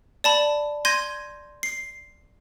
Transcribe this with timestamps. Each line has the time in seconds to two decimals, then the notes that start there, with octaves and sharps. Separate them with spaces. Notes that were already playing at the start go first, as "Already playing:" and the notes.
0.24 D5 A5 B5
0.85 C6 G6 G#6 A#6 D#7
1.63 C7